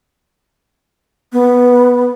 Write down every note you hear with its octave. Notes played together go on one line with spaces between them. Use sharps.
B3